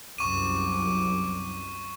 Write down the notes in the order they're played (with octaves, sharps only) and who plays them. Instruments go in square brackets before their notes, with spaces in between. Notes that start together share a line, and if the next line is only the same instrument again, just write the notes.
[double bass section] C2 F#2 [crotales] C#6 D#7 [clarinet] D6